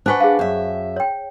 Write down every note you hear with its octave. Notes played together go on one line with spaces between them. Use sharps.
D4 B4 C5 F#5 G#5 C#6
G#4 F5
F#2 E5
C#5 G5